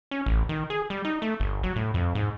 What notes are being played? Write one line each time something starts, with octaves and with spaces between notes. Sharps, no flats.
C#4
A1
D#3
G#4
G3
D#4
A3
G1
F#3
A2
F2
G#2